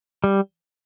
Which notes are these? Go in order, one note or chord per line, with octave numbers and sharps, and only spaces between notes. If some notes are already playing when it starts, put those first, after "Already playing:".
G3